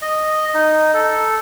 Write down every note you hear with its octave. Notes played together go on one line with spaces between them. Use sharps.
D#5
D#4
A4